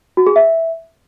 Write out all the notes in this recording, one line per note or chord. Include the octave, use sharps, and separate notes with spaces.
F#4
G#4
E5